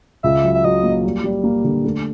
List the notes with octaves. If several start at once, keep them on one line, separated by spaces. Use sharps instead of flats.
C#2 E5
F#3
E5
F#3 D#5
A#3
G3
G3
A#3
D3
A3